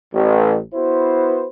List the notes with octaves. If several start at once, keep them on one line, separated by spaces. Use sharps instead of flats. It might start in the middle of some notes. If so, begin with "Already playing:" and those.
A1
B3 E4 F#4 B4 C5